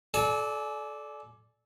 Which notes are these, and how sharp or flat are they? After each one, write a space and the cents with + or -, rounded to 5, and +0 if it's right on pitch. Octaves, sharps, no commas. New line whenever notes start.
A4 -25 D5 +0 G#5 +35